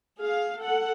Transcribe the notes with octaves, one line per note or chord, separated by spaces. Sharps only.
G#4 F5
A4 F#5